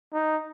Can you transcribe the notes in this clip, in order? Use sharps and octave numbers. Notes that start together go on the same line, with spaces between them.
D#4